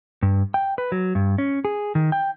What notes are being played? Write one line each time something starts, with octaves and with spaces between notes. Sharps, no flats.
G2
G5
B4
F#3
G2
C#4
G#4
D#3
G5